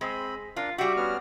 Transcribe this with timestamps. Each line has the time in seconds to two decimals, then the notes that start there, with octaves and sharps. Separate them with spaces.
0.01 G#3 C4 B5
0.56 D4 F4 A#4
0.78 G3 F#4 E5 G5
0.97 B3 C#4 F6